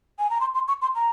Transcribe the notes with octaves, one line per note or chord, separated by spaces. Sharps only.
G#5
A#5
C6
C6
C#6
C6
A#5